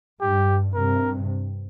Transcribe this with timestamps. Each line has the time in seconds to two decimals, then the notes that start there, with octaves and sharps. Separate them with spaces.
0.21 G2 G4
0.74 G2 C3 A#4